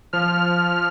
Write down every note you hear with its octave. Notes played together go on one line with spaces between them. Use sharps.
F3 F6